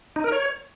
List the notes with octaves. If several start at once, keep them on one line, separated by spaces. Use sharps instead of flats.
D#4
A#4
C#5